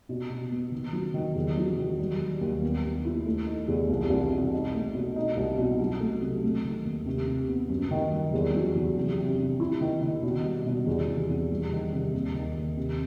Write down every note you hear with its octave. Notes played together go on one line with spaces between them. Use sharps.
B2
B2
B3
D#3
F#3
D#3
E2
F#3
D#3
G3
G3
D#2
B3
B3
E4
A3
D#4
E2
C2
C2
B2
D#4
A3
B2
D#4
C2
B2
F#3
A3
C3
A3
D#3
D#2
C3
C3
B3
F#2
D#3
G3
E2
F#3
E2
C3
C3
C3
E4
D#3
D#3
B2
G3
B2
E2
C3
E2
G3
D#3
C3
D#2
D#3
D#2
C3